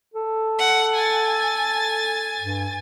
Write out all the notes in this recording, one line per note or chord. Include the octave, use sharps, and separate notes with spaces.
A4
F#5
G#5 A6
G2